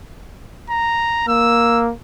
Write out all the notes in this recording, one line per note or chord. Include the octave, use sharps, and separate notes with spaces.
A#5
A#3 E6